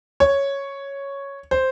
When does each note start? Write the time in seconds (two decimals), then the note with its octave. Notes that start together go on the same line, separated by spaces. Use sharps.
0.20 C#5
1.51 C5